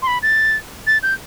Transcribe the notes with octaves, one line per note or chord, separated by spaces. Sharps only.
C6
B5
A6
A6
G6